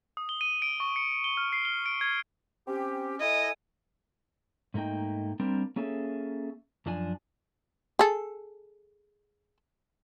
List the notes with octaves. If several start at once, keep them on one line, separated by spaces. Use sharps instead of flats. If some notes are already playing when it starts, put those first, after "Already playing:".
D#6
G7
D#7
D7
C#6
C#7
G7
F6
C7
G7
D7
G#6
C4 C#4 G4
E4 A4 D#5 G#5
G#2 A3 A#3 D#4 G5
G3 A#3 C4 D4 A#4
A#3 C#4 G#4 A4 E5
F#2 F3 D4 G#5
G#4 A4